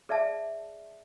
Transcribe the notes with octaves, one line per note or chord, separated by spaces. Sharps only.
G#4 D5 E5 A5